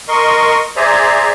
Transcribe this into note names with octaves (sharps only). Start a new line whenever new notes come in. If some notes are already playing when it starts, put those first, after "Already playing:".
A#4 D#5 C6 C#6
G#4 C5 D5 E5 G#5 A#5